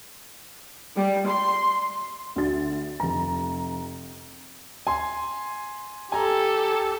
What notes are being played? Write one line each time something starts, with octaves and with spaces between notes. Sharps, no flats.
G3
C6
D2 D3 F#4 A6
F1 A#5
G#5 C6
G4 A4 G#5 A#5